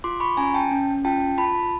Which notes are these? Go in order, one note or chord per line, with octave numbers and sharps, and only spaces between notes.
F4 C6 D6
B5 C#6
C#4 G#5 A#5
G5 A5
C#4
F4 G5 A5
F4 A5 B5